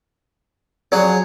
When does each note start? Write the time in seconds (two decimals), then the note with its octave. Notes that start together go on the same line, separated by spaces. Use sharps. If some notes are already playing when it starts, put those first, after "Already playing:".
0.92 F3 F#3 F#4 G#4 D5